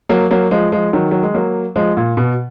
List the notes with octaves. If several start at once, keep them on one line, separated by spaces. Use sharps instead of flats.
F#3 A#3
F#3 A#3
F3 G#3
F3 G#3
D#3 F#3
F#3
G#3
F#3 A#3
F3 G#3
A#2
B2